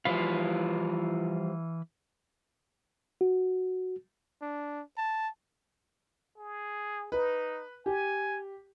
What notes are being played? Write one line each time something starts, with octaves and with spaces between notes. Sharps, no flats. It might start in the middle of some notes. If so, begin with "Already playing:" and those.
E3 F3 G3 F4 B4 F5
F#4
D4
A5
G#4
D#4 B4
G4 G#5